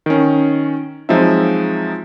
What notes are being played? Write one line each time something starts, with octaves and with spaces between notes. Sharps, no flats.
D#3 C#4
F3 F#3 G#3 C4 D#4 E5